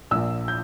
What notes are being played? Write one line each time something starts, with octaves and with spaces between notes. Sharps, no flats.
A#1 A#2 E6
G6